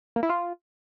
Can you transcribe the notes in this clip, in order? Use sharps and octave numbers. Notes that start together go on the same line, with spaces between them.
A#3
E4
F4